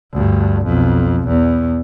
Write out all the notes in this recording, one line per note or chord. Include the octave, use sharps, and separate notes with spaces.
D2 G2
B1 F2
E2